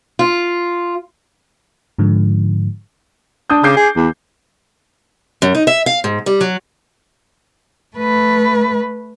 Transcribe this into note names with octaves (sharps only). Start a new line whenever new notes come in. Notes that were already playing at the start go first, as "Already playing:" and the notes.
F4
G#2 D3 F3
D4 D#6 G6
C#3 D6 G6 C7
G#4
E2
F#2
D#4
E5
F5
G#2
G3
F#3
A3 B4